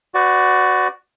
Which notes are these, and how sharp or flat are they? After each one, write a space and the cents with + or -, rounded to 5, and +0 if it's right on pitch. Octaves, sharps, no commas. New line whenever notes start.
F#4 +0 B4 +40 D5 +0